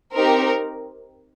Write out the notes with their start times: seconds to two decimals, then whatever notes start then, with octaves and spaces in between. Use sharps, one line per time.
0.14 C4 D#4 G4 A#4